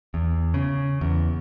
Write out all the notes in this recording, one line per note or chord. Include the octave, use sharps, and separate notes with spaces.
E2
C#3
E2